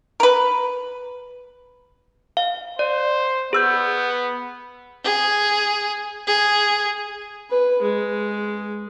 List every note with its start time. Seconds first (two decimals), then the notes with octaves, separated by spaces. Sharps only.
0.20 A#4 B4
2.37 F5
2.79 C5 D5
3.53 B3 G#4 E6 G6
5.04 G#4
6.27 G#4
7.51 B4
7.81 G#3